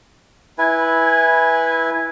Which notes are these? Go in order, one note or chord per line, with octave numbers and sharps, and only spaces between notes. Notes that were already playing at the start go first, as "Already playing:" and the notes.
E4 B4 G#5